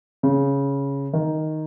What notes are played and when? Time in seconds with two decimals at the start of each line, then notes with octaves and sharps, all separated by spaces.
0.23 C#3
1.13 D#3